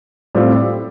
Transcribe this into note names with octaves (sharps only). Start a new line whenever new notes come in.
A2 G3 C4 F4